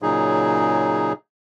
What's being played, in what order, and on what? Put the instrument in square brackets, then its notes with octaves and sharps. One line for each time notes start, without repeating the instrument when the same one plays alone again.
[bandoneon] A#2 C#3 F#3 D#4 G#4